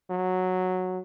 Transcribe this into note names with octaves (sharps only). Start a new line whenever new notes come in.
F#3